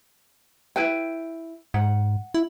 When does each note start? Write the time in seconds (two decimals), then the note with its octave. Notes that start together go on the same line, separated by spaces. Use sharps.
0.76 E4 B4 G5
1.74 G#2 F#5
2.34 E4